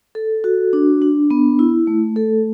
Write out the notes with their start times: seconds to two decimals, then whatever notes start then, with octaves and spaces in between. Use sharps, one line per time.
0.15 A4
0.44 F#4
0.73 D4
1.02 D4
1.30 B3
1.59 E4
1.87 A3
2.16 A4